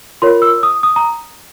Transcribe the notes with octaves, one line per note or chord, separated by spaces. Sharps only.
F4 A#4 C#5 C6
E6
D#6
D#6
A#5